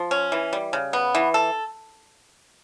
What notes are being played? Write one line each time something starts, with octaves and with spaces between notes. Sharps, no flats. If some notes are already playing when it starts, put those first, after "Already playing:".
Already playing: F3
C#4
E3
G3
C#3
B3
E3
A4